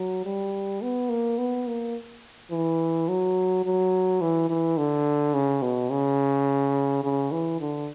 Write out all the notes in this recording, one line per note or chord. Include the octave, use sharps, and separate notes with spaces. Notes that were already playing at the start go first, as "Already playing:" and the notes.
Already playing: F#3
G3
B3
A#3
B3
A#3
E3
F#3
F#3
E3
E3
D3
C#3
B2
C#3
C#3
E3
D3